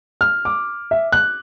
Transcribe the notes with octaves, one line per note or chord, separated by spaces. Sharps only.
F6
D6
E5
F#6